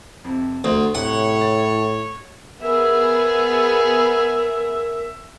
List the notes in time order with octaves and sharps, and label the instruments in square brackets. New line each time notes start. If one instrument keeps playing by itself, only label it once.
[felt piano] F2 C3
[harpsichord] D2 [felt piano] C5 D5 F#5
[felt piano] C2 [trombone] A2 [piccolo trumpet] C#5 [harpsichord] F#5
[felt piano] A6
[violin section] B3 G#4 [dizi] A#4 [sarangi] E5